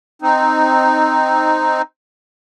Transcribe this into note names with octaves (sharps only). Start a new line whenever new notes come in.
C4 D#4